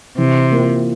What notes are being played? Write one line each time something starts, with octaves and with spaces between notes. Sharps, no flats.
C3 E3
A#3 F4 A#4